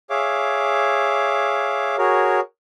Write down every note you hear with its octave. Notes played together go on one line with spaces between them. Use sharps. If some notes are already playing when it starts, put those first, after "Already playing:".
G#4 C#5 E5 F5 D6
F#4 G#4 A#4 C#5